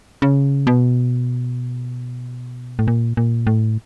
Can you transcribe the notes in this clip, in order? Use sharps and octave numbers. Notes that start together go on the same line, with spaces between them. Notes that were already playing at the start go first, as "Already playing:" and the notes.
C#3
B2
A2
A#2
A#2
A2